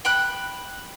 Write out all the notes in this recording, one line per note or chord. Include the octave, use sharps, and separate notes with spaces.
G5 B5 F#6